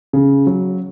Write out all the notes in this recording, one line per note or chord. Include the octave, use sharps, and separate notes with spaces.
C#3
F#3